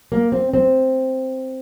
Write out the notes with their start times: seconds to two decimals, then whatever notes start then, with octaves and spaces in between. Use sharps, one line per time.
0.12 A#3
0.32 C4
0.54 C4